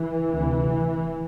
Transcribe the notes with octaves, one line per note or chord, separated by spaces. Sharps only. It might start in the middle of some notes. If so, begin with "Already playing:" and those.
Already playing: E3
D2 C3